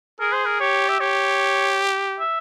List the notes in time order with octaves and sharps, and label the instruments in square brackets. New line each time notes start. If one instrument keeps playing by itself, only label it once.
[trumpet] G#4 [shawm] A#4
[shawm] C5
A#4
[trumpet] G4 [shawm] C#5
[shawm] E5
[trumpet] G4 [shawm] C#5
[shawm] E5